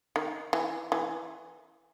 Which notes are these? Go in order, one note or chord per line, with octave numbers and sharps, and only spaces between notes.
D#3
E3
E3